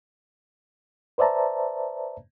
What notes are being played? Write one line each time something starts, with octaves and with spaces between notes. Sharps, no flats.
B4 C5 D5 E5 A5 A#5